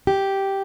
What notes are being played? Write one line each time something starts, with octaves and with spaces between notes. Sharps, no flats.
G4